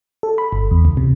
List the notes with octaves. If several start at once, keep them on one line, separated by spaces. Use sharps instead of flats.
A4
B5
G1
E2
C#2
C3